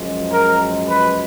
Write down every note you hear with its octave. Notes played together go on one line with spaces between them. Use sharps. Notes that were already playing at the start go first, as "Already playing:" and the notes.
Already playing: F#2 F3 G#3
A#4
B4